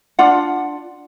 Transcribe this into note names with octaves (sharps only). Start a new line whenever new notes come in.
D4 F4 F#5